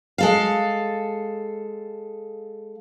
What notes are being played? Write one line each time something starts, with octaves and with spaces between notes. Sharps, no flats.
G#3 A4 F5